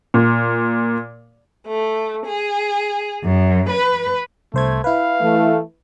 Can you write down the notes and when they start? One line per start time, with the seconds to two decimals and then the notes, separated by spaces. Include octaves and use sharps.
0.14 A#2
1.66 A3
2.26 G#4
3.24 F#2
3.69 B4
4.54 C2 A3 C5 G#6
4.84 E4 B4 F5
5.21 E3 A3